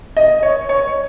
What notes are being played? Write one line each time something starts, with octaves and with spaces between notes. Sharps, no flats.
D#5
C#5
C#5